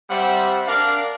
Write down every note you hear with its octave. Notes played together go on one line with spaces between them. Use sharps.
G3 C4 C5 E5 F#5
D4 A#4 D5 F5